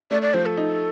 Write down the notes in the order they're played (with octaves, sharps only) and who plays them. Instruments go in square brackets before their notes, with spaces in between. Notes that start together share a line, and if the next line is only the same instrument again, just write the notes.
[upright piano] A3 [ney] D5
[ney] D5
[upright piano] F3 [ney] C5
[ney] A4
[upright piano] D#4